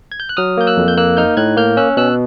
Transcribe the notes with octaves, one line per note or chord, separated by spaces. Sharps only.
G#6
G6
F#6
F#3 D#6 F6
A#3 G6
E6 F#6
F2
G6
A#3 E6 F#6
D#4 F6 G6
A2 F#6 G#6
A#3 F6 G6
C#4 E6 F#6
B2 E6 F#6